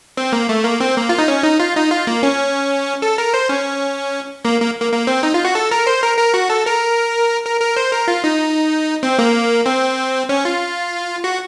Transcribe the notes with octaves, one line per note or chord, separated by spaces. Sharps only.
C4
A#3
A3
A#3
C4
A#3
F4
D#4
C#4
D#4
F4
D#4
F4
A#3
C#4
A4
A#4
C5
C#4
A#3
A#3
A#3
A#3
C4
D#4
F4
F#4
A4
A#4
C5
A#4
A#4
F#4
A4
A#4
A#4
A#4
C5
A#4
F4
D#4
C4
A#3
C4
C#4
F4
F#4